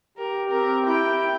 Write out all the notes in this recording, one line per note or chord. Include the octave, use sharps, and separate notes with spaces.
G4 A#4
C4 A#4
E4 G5